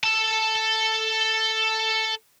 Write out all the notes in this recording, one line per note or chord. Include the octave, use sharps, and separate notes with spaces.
A4 A5